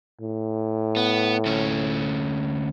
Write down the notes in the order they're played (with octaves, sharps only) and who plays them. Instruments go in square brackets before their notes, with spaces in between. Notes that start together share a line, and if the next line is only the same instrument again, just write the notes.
[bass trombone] A2
[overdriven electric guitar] B3
D2 C#4